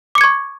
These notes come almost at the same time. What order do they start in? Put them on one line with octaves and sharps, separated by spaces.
D6 C#7 G#6 C#6